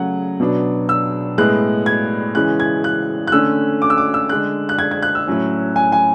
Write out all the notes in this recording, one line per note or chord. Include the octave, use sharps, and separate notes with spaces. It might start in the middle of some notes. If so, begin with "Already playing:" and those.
Already playing: C#3 F#3 A3 C#4 F#5
B2 F#3 B3 D4
E6
A2 G#3 B3 F#6
G#6
C#3 E3 G#3 C#4 F#6
G#6
F#6
F#6
D3 A3 C#4 E6
D6
E6
D6
E6
D3 G#3 D4 F#6
F#6
G#6
G#6
F#6
E6
A2 F#3 C#4
G#5
G#5